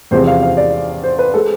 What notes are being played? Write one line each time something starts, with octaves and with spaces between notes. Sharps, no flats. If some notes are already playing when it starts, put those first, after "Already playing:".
E2 C3 F3 G#3 C5
F5
F5
D5
C5
B4
G#3 A4